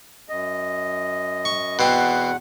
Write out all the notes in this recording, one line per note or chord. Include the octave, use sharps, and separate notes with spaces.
F#2 D#5
C#6
E2 B2 C4 F#5